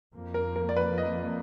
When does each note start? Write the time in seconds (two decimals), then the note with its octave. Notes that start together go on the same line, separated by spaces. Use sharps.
0.14 F2 F3 A#3
0.34 A#4
0.56 A#4
0.69 D5
0.77 B4
0.98 D#5